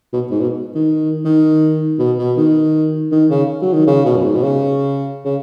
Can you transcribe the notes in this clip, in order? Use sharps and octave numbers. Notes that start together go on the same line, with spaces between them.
B2
G#2
B2
D#3
D#3
B2
B2
D#3
D#3
C#3
F#3
D#3
C#3
B2
F#2
G#2
B2
C#3
C#3